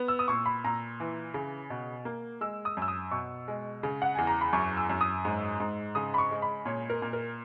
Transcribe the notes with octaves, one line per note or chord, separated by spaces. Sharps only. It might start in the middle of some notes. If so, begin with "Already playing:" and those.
Already playing: B3
E6
D#6
A#2 C#6
B5
A#2 A#5
E3
C#3
B2
A#3
G#3 E6
D#6
F#2 E6
D#6
B2 C#6
G#3
C#3
F#5
E2 G#5
A#5
B5
F#2 C#6
E6
F#2
D#6
G#2
G#2
C#3 D#6
B5
C#6
G#3
B5
A#2 C#5
A#4
A#2
A#4